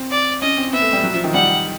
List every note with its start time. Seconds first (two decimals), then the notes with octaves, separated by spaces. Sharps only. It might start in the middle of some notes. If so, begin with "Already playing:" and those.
Already playing: C4
0.11 D5
0.42 C#4 D#5
0.57 C4
0.72 B3 E5
0.82 A3
0.93 G3
1.03 F#3
1.14 F3
1.24 D#3
1.34 G3 F#5